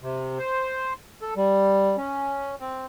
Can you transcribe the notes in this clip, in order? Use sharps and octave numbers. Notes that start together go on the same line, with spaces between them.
C3
C5
A4
G3
C#4
C4